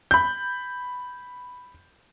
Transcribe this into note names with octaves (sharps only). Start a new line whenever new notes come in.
B5 G6